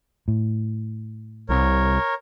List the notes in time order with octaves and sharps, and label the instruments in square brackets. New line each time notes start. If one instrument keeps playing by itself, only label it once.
[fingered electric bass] A2
[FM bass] C2 [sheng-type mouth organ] A#4 C#5